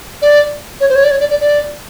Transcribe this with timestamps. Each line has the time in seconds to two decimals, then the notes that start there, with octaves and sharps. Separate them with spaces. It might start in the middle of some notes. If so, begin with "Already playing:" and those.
0.22 D5
0.80 C#5
0.89 C5
0.96 C#5
1.04 D5
1.11 C#5
1.20 D5
1.30 D5
1.41 D5